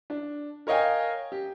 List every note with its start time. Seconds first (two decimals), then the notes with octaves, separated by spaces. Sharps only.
0.10 D4
0.67 A#4 C#5 D#5 F5 G5 G#5
1.32 G4